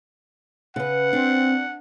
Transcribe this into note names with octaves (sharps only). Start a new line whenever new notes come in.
C#3 B4 F#5
C4 D4